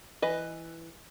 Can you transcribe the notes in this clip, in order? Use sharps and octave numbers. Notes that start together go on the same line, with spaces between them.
E3 B4 D#5